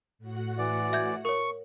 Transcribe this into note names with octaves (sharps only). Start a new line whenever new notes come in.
A2 F#4 F#5
E3 D5
E5 G6 G#6
A#4 C#5 C#6